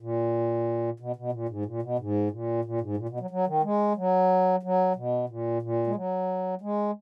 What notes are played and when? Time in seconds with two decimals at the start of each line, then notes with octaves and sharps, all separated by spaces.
0.01 A#2
1.00 B2
1.16 B2
1.32 A#2
1.49 G#2
1.66 A#2
1.82 B2
1.99 G#2
2.31 A#2
2.65 A#2
2.81 G#2
2.97 A#2
3.09 B2
3.20 F#3
3.30 F#3
3.47 D#3
3.63 G#3
3.96 F#3
4.63 F#3
4.96 B2
5.29 A#2
5.62 A#2
5.87 G#3
5.95 F#3
6.61 G#3